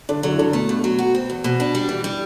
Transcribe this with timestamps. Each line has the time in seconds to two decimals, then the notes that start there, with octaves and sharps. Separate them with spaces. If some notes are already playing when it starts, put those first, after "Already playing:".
0.09 G2 D3 D4
0.23 D3 F#3 D4
0.32 E4
0.38 G2 D3 D4
0.53 B2 A3 B3
0.69 G2
0.84 F#3
0.99 F#4
1.15 C4
1.30 E2
1.44 B2
1.60 D4
1.75 G3
1.89 E3
2.04 G3